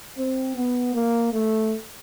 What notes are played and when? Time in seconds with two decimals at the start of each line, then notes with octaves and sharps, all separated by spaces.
0.18 C4
0.56 B3
0.94 A#3
1.33 A3